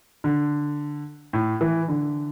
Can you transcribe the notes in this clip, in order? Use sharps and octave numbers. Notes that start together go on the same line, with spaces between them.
D3
A2
E3
D3